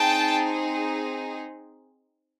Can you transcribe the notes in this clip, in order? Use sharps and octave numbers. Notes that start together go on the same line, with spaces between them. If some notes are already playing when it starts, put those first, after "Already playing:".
Already playing: C4 D#4 G#4 G5 A5